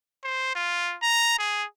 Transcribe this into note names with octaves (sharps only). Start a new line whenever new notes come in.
C5
F4
A#5
G#4